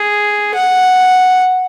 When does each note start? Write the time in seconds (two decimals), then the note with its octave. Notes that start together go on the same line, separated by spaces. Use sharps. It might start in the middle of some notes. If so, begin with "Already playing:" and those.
Already playing: G#4
0.55 F#5